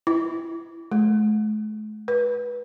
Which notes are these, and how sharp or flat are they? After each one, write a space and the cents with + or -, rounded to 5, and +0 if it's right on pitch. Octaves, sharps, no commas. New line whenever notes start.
E4 +10
A3 -45
B4 -25